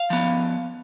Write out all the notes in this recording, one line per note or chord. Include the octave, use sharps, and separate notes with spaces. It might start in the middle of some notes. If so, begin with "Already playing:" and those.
Already playing: F5
F3 B3